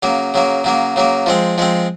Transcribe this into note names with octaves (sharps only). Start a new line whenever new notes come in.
C#3 F#3 A#3
C#3 F#3 A#3
C#3 F#3 A#3
C#3 F#3 A#3
F3 G#3 C4
F3 G#3 C4